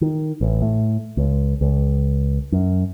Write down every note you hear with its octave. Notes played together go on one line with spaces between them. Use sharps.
D#3
A1
A2
C#2
C#2
F#2